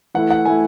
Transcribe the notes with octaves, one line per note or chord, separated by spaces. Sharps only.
E3 A3 E4 F#5
F#5
E3 A3 E4 G#5